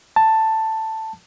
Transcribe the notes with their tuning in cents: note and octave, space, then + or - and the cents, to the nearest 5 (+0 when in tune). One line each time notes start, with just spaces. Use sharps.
A5 +5